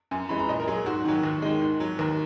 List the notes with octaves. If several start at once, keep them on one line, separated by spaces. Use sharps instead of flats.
F#2 G#5
E3 G#3 B5
A#5
A#2 D#5
A#4
F#3 G#4
G#2 F#4
D#3 F#3
D#2
D#3 G#3
G#2
F#3
D#2 A#4